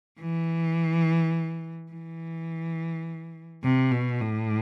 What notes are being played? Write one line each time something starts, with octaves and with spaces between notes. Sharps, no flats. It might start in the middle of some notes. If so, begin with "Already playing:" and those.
E3
E3
C3
B2
A2